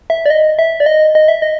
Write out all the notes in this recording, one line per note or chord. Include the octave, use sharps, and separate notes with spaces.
E5
D5
D#5
E5
D5
D#5
D#5
E5
D#5